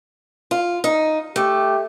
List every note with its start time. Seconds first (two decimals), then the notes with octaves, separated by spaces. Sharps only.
0.51 F4
0.84 D#4
1.36 A3 G4